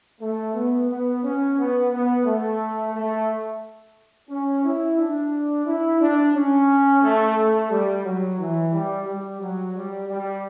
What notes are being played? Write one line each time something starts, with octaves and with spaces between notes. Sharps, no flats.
A3
B3
B3
C#4
B3
B3
A3
A3
C#4
E4
D4
E4
D4
C#4
A3
A3
G3
F#3
E3
G3
G3
F#3
G3
G3